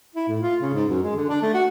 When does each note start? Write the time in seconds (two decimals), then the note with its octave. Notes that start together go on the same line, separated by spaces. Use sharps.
0.15 E4
0.28 A2
0.41 F4
0.62 C#3
0.74 G#2
0.89 F#2
1.03 G#3
1.16 D3
1.29 D4
1.42 A3
1.54 F#4